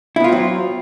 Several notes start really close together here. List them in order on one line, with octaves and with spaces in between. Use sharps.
E4 B3 F4 C4 F#3